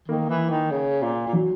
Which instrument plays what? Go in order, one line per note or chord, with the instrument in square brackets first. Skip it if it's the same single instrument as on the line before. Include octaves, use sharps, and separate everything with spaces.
[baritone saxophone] D#3 [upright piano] A#3
[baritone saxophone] E3
D#3
C#3
A#2
A#2
[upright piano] F#3